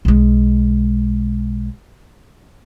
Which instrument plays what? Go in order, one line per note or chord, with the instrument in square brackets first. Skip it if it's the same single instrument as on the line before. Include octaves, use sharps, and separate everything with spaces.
[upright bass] B1 G#3